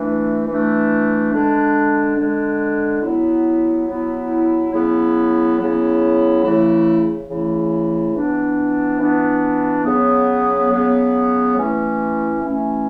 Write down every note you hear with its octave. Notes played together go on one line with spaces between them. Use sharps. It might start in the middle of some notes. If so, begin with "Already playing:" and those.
Already playing: E3 A3 D4
E3 A3 D4
D3 G#3 D4
D3 G#3 D4
F#3 B3 E4
F#3 B3 E4
C#3 F#3 B3 E4
C#3 F#3 B3 E4
C#3 E3 A3 E4
C#3 E3 A3 E4
E3 B3 D4
E3 B3 D4
C#3 F#3 B3
C#3 F#3 B3
E3 A3 C#4 E4
E3 A3 C#4 E4